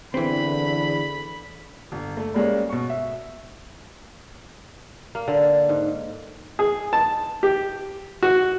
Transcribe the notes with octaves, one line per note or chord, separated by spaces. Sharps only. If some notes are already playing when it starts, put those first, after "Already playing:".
E2 D3 E3 C4 B5
G1
A3
G3 G#3 A#3 C#4
B2 C#6
E5
A#3
D3
G#2
G#4
A5
G4
F#4